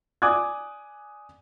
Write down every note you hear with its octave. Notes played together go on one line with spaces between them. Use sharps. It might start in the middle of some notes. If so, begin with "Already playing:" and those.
D5 G#5 D6 D#6 F#6 G#6